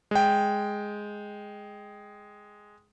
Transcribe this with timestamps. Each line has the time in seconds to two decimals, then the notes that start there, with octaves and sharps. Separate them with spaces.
0.11 G#3 G5